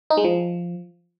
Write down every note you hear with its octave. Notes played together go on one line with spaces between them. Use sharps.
D#4
G#3
F3